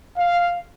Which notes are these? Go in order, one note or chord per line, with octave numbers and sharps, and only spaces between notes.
F5